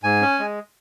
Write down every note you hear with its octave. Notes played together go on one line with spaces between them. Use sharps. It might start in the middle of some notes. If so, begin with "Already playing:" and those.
G#2 G#5
C#4
G#3